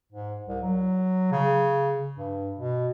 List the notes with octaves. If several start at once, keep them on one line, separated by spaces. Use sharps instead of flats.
G#2
C2
F#3
C#3
G2
B2